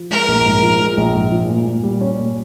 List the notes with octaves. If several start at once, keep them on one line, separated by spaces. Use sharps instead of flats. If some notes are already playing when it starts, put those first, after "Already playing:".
Already playing: F3
G#3 A#4
A#1
G#2
F3
G#3
A#1
G#2
F3
A#2
A#2
G3
C#4
A#2